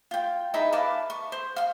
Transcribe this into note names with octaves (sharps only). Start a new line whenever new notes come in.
F4 G5
D#4 E4 G#4 E5
B4 F5 A5 D6
C#6
C5
F5 C6